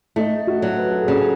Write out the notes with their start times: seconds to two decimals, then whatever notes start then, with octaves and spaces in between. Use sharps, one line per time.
0.16 A3 D#4
0.47 F#4
0.62 F#3
0.78 B4
0.90 A4
1.02 G#4
1.08 C#3
1.13 A4